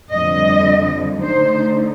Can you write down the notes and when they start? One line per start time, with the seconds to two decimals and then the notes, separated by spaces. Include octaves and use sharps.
0.12 F2 D3 G3 D#5
1.21 D3 A3 D#4 C5